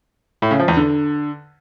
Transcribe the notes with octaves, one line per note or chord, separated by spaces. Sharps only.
A2
C#3
F3
E2
D3